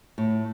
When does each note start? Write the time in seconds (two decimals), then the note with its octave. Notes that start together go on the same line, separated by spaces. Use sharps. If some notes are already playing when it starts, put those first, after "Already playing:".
0.18 A2